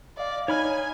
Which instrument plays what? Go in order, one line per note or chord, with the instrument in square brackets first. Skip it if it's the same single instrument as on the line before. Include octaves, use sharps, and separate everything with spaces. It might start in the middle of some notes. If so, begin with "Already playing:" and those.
[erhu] D5 [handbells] D#5 F5
[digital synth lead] D#4 [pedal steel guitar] C#5 B5 F6 [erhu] G#5